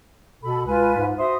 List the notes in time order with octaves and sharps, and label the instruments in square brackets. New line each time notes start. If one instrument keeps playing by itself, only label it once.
[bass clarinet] B2 [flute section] A4 B5
[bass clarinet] C#2 [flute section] F4 B4 G#5
[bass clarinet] G#2
[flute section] F#4 E5 D#6 [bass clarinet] C5